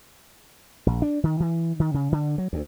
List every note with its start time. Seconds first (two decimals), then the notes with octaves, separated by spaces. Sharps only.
0.86 A#1
1.02 D4
1.24 D#3
1.40 E3
1.80 D#3
1.94 C#3
2.12 D3
2.38 F#3
2.53 D2